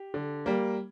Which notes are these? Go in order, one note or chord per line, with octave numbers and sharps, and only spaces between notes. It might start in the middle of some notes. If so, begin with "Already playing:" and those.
Already playing: G4
D3
G3 A#3